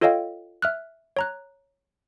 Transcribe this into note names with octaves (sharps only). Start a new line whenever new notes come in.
F4 A4 C#5 D#5 F5 G5
E5 F6 F#6
C#5 A#5 F#6